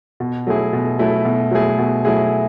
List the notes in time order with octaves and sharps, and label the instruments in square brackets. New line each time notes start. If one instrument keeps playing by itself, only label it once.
[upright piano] B2
F#3 A3 E4 G#4
B2
F#3 A3 E4 G#4
B2
F#3 A3 E4 G#4
B2
F#3 A3 E4 G#4